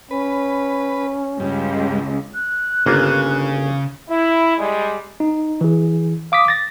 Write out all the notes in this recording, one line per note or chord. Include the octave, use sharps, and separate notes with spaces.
C#4 B4
C#2 G2
F#6
G1 C#3 A#3 F4
E4
G3 G#3
D#4
E3 G#4
F5 D6 D#6 B6
A6 A#6